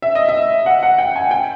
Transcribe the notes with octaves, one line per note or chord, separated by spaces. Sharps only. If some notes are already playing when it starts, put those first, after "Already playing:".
E5
D#5
E5
F#5
F#5
G5
G#5
G5